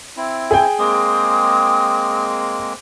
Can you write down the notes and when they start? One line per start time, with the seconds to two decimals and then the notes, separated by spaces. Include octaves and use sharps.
0.17 C4 E4
0.51 G#4 G5
0.79 G#3 A#3 C4 D#6